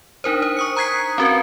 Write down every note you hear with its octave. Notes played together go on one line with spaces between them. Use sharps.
D4 D#4 A#4 C5
C5
C#6 D#6 C#7
A#5 D#6 F#6 G#6 B6 C7
C4 C#4 F#4 A#4 B4